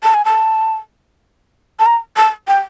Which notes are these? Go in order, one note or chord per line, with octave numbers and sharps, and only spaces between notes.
A5
G#5
A5
A5
A#5
A5
G5